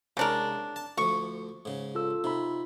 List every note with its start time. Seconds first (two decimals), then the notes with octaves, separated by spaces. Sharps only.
0.17 C2 C#3 G#3 D4 A#4
0.76 A5
0.98 D2 F3 C#6
1.65 G#2 C#3
1.95 F4 A4 E6
2.24 C3 D#4 F4 B5